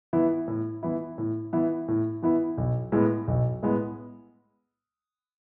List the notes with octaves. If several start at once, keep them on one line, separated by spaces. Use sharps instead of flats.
E3 B3 E4
A2
E3 B3 E4
A2
E3 B3 E4
A2
E3 B3 E4
B1
A2 G#3 B3
B1
A2 G#3 B3